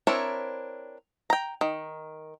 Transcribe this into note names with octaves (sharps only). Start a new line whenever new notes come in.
C4 D4 E4 A#4 C#5
G5 A#5
D#3